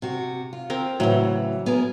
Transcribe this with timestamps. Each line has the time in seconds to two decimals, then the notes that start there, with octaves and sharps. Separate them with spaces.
0.02 C3 F#4
0.53 F4
0.70 C4 A#4
1.00 A2 C#3 E3 F#3
1.66 B3 G#4 A#4